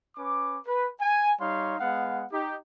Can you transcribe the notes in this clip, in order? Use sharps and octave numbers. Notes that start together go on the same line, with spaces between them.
C#4 B4 D6
B4
G#5
G3 D#4 C#5 F5 C6
G#3 B3 F5 F#5
D#4 G4